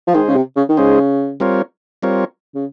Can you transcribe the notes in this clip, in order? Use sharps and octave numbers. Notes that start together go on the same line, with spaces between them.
F3
D#3 G#3 D#4 G#4 C5
C#3
C3
C#3
D#3
C#3 G#3 D#4 G#4 C5
G3 C4 F4 A#4 C#5
G3 C4 F4 A#4 C#5
C#3